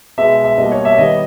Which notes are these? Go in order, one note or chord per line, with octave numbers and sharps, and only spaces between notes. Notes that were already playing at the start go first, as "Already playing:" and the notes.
B2 G#3 B3 E5
E5
B2 G3 A#3 D#5
C#5
E5
C#5
D#3 G3 B3 D#5